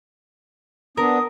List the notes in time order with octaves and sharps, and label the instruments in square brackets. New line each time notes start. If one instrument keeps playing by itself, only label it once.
[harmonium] B3 D4 [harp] A#4 [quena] D#6